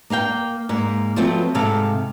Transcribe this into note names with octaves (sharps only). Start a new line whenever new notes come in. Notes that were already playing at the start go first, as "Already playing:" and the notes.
A#3 A#4 F5 G5
G#2 A#3
F3 F#3 A3 B3 C4 F4
G#2 C3 A4 F5